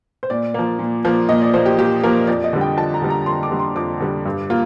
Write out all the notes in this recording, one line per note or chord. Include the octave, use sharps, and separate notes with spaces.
C5
A#2 D5
F3 A#3
A#2
F3 A#3
A#2 D#5
D5
F3 A#3 C5
G4
A#2 G4
F3 A#3 A#4
F2 D5
D#5
D3 G3
G5
F2 A5
A#5
D3 G3
A#5
F2 C6
D6
D3 G3
C6
F2 D6
D3 G3
G2
A#3 F4